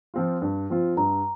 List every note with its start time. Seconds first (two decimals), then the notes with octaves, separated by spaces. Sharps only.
0.14 F3 C4 F4
0.42 G2
0.70 F3 C4 F4
0.97 G2 A#5